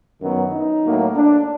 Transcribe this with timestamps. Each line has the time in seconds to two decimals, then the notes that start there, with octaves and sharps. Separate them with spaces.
0.20 F#2 D#3 F#3 B3
0.52 D#4
0.84 A2 F#3 A#3
1.16 D4